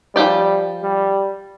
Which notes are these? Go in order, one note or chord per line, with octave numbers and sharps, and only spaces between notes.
F3 G3 C4 G4 D5
G3